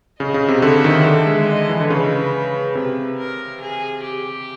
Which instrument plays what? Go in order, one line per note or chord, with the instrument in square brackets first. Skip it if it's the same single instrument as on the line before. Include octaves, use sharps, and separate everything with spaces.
[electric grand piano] C#3 [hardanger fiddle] D#5
[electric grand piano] C#3
C3
[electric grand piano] D3 [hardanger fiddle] E5
[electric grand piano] D#3
D3
G#3
[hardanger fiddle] D#5
[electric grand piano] E3
D3
[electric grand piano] C#3 [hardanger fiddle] B4
[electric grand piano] C3 [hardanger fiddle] B4
[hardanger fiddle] A#4
G#4
G4